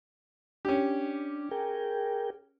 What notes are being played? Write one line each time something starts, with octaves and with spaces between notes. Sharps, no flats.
C#4 D4 G4
G#4 A#4 G5